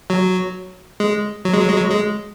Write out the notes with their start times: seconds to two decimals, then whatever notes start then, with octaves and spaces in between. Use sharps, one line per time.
0.10 F#3
1.00 G#3
1.45 F#3
1.53 G#3
1.61 F#3
1.69 G#3
1.77 F#3
1.91 G#3